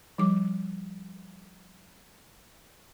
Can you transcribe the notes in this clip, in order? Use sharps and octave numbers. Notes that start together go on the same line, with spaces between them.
F3 G3 D6